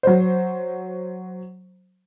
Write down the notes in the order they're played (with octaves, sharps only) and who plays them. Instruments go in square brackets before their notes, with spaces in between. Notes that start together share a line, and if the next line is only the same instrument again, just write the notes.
[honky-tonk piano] F#3 C5